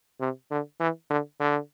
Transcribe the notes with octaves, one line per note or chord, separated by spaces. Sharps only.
C3
D3
E3
D3
D3